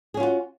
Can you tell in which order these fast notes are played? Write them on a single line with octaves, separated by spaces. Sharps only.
G#4 C#4 F4 F#4